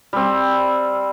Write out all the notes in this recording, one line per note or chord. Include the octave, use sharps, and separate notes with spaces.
G3 C4